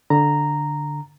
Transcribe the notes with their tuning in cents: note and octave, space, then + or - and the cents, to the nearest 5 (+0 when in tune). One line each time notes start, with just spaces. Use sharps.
D3 +0 A#5 -5